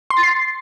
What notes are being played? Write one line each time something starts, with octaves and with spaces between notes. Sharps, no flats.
C6
A6
C7